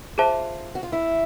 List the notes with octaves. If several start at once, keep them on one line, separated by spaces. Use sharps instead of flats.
F4 G#4 C5 E5 A5
F#4
F4
E4